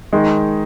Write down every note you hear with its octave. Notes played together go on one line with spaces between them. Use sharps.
D#3 G#3 D#4